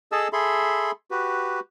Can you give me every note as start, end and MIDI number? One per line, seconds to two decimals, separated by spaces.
0.12 0.28 68
0.12 0.28 69
0.12 0.28 75
0.12 0.28 81
0.12 0.28 88
0.33 0.91 68
0.33 0.91 69
0.33 0.91 76
0.33 0.91 83
0.33 0.91 84
1.11 1.60 66
1.11 1.60 67
1.11 1.60 71